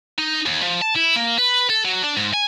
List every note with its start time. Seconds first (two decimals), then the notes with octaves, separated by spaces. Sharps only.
0.18 D#4
0.46 D#2
0.63 F3
0.82 A5
0.96 E4
1.16 A#3
1.38 B4
1.70 A4
1.85 F#3
2.03 D4
2.17 G#2
2.33 G#5